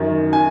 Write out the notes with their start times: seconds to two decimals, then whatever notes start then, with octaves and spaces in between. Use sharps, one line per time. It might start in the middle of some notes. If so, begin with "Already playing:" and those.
Already playing: F#2 D#3
0.33 G#5